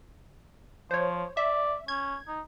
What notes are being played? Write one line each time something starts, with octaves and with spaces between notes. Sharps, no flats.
F3 C5 C#5
D5 E5
C#4 G#6
D#4